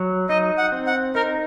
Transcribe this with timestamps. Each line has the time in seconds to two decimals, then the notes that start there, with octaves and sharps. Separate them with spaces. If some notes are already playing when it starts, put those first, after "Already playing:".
Already playing: F#3
0.29 D#4 D#5
0.58 F#5
0.72 C4
0.87 F#5
1.15 D#4 A#4